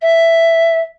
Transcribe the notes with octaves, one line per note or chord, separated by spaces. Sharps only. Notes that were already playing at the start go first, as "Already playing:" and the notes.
E5